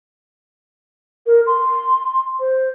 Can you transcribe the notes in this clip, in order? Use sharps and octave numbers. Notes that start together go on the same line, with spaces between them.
A#4
C6
C5